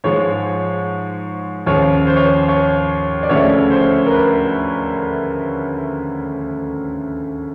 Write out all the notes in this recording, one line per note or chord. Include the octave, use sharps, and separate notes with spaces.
G#2 F3 G#3 C#5
D#2 C#3 F3 C#5
C5
C#5
C5
C#5
D5
D2 C#3 F3 A3 C#5
C5
A#4
B4